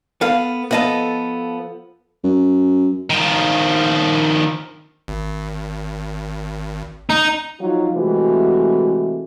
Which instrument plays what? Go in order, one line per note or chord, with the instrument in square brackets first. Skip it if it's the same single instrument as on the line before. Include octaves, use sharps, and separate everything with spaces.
[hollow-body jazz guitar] B3 A4 F5
[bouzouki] F3 A4 [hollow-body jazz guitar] B3 D#5 A5
[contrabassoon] F#2
[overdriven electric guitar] D#3 F3
[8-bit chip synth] G#1
[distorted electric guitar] D#4 [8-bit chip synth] A#5
[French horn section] F3 F#3 D#4 F4
C3 E3 G#3 A3 C4 F#4